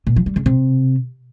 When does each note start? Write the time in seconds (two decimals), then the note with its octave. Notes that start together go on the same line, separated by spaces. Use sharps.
0.07 A#2
0.16 F3
0.26 G3
0.36 C#3
0.46 C3